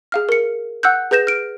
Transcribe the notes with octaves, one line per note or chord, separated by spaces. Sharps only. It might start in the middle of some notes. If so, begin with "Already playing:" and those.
G#4 F5 F6
A#4 C#7
F#5 E6 F#6 G6
G#4 B4 G6 A#6 E7
F6 D7